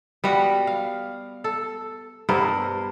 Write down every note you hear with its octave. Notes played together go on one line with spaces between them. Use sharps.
G3 B3 F#4
F5
A4
G2 B3 A#4 C5